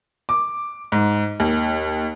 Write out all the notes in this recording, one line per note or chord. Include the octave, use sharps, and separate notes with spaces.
D6
G#2
D#2